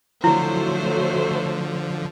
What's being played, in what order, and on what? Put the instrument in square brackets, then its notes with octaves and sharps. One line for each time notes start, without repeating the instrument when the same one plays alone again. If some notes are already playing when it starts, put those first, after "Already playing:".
[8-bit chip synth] D3 F3 [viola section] F#3 A3 C5 [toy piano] E4